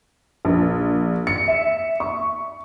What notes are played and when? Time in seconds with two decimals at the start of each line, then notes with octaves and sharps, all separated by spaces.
0.45 A#1
1.27 C#7
1.48 E5
2.00 C#6